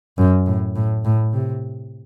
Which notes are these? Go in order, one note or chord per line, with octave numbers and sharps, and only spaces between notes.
F#2
A2
A2
A2
C3